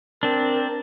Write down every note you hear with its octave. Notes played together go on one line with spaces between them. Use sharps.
C4 D4 A#4